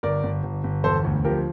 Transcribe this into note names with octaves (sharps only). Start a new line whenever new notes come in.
G1 A#4 D5
G1
G1
G1
E1 A4 C5
D2
F3 G4 A#4